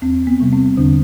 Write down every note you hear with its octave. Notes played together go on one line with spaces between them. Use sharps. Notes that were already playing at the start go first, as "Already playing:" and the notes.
E2 C4
B3
C3 G3
C4
E2 D3 D4